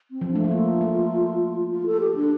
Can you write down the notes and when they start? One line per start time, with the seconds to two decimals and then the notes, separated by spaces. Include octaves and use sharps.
0.11 C4
0.21 F3
0.31 A3 D4
0.44 A3
0.51 A#3 F4
0.81 A3
1.71 F4
1.86 A4
2.01 G4
2.16 D4